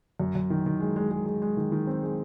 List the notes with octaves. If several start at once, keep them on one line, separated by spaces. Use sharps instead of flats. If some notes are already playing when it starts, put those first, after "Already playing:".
F#2
F#2
D#3
D#3
G#3
G#3
G#3
G#3
G#3
D#3
D#3
C4
G#3